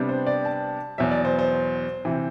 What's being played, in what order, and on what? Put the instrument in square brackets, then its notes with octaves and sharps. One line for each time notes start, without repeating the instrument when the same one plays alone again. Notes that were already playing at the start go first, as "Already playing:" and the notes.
Already playing: [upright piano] C3 G3 B3 D4
C5
D5
A5
E2 B2 F#3 E5
D5
C5
C5
C3 E3